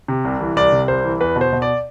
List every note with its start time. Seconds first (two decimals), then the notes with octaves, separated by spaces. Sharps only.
0.08 C3
0.25 C2
0.41 E3
0.56 C2 D5
0.72 C3
0.88 C2 C5
1.05 E3
1.20 E2 B4
1.36 B2
1.41 C5
1.53 B2
1.62 D5